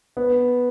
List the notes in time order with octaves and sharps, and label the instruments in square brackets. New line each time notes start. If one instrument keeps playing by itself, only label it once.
[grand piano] B3